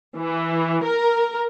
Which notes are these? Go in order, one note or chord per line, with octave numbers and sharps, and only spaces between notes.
E3
A#4